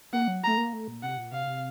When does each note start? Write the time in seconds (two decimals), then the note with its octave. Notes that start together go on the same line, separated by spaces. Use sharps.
0.13 A#3 F#5
0.28 F#3
0.44 A3 A#5
0.57 A#3
0.73 A3
0.88 A#2
1.02 C3 F#5
1.17 A#2
1.32 C3 F5
1.43 C#3
1.47 C3